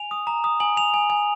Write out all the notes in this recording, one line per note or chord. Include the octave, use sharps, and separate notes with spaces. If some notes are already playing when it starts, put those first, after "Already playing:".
Already playing: G#5 F7
D#6
A#5
D#6
G#5 F#7
G#5 F7
G#5
G#5